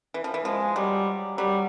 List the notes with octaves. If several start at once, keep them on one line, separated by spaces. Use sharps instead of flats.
E3
F3
E3
F3 G#3
F#3 G3
F#3 G3